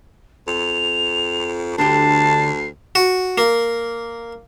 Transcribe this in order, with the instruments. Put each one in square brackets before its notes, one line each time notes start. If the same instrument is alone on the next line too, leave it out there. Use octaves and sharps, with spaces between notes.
[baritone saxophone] F2 [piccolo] F7
[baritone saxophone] D2 [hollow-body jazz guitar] D3 G4 [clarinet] A5 [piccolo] C7
[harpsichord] F#4
A#3